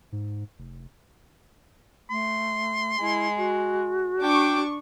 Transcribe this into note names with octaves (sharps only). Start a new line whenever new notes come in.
G#2
F1
A3 C6
G#3 E4
F#4
D4 G5 C#6 D6